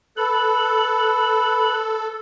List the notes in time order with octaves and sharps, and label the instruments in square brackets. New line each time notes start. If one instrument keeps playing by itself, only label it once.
[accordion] A4 [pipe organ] B4 B5